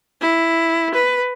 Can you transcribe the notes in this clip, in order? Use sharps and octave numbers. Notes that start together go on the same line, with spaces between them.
E4
B4